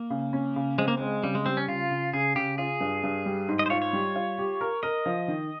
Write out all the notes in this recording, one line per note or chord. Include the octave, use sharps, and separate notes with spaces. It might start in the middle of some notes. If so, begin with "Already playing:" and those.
Already playing: A#3
C#3
C#4
C#3
G#3 C4
A#3
G#3 C4
C#3 G3
G#3
G3 C4
C#4
C#3 F4
C#3
C#3 G#4
C#3 G4
F4 G#4
G2
G2
G3
G#2
D#5
C5
F4 C#5
C#5
G3
F4
G4
A#4
A#4 D#5
F3
D#3